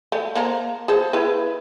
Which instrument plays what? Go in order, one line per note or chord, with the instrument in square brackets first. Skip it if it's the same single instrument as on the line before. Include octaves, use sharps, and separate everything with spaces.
[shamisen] A3
A#3 C5 A#5
G#4 A4 C5
E4 B4